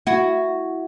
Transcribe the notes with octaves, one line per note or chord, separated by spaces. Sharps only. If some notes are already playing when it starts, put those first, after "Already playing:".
E4 F#4